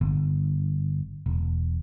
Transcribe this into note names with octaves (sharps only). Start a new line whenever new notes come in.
G1
E1